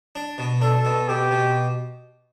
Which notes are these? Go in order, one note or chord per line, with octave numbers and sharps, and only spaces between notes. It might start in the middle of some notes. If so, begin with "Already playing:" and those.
D4
B2
D4 A4
B2
B2 G4
B2